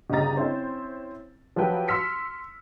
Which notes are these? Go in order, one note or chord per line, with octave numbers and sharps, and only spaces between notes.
G1 C#3 G4 D#5 A#5 A6
C4 C#4 E4 C5
F3 F#3 G4 B4 G5
C6 E6 F6 B6 C#7